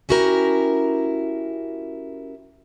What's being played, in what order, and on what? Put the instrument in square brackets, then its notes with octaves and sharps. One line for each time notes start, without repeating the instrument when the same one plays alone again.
[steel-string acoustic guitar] C#4 E4 F#4 G4 A#4